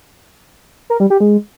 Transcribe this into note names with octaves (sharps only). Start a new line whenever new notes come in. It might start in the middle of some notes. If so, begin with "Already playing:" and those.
A#4
G3
G4
G#3